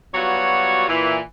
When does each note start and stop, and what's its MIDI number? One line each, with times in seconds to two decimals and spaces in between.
0.14 0.86 54
0.14 0.86 55
0.14 0.86 59
0.14 0.86 65
0.14 0.86 66
0.14 0.86 73
0.89 1.19 46
0.89 1.19 52